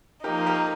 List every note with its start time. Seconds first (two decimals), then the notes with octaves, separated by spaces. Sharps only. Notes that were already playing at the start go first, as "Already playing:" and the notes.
0.24 F3 A#3 D#4 G4 A#4
0.46 G4 A#4